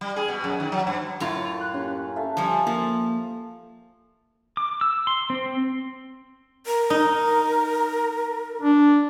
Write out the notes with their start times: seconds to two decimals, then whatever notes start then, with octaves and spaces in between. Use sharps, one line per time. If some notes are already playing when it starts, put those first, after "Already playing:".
0.01 G3
0.16 G#4
0.28 B2
0.44 F#2
0.60 D#3
0.72 F#3
0.87 G2
1.20 F#2 A2 F4
1.61 F#6
1.74 A#3 C#4 G4 B5
2.16 A4 E5 F5
2.37 F3 G3 G#5
2.67 F3 A#3
4.57 D6
4.81 E6
5.07 C6
5.30 C4
6.65 A#4
6.90 D#4
8.62 D4